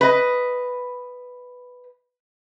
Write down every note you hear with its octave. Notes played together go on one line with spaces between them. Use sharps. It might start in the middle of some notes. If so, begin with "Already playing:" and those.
B4 D#5